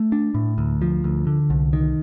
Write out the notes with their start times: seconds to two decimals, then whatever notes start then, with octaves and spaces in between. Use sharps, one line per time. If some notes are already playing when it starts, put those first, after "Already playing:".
Already playing: A3
0.12 D4
0.35 A2
0.58 D2
0.82 F3
1.04 D2
1.27 D3
1.50 C2
1.73 D#3